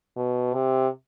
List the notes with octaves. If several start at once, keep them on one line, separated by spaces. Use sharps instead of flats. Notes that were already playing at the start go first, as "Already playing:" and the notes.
B2
C3